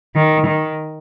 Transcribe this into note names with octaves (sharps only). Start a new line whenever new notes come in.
D#3
D#3